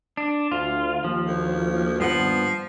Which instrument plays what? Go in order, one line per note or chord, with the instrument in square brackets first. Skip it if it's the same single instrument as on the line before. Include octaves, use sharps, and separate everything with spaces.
[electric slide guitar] D4
[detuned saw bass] D2 [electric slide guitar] F4
[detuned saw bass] D#2 [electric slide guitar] F3
[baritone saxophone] D2
[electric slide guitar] G2 B3 F#5 [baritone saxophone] F3